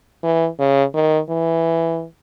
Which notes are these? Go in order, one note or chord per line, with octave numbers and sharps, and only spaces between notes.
E3
C#3
D#3
E3